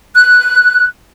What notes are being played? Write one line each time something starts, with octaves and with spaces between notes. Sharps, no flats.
F#6